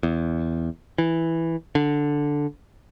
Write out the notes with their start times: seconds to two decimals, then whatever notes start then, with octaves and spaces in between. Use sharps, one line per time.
0.03 E2
0.98 E3
1.75 D3